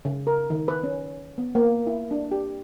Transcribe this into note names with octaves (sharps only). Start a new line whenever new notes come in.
C#3
A#4
D#3
B4
C#4
B3
A#3
E4
D4
G4